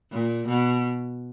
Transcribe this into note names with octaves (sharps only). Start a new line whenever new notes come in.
A#2
B2